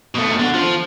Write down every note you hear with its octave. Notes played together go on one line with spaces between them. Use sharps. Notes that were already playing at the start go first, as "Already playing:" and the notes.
B2 A3
D3
F3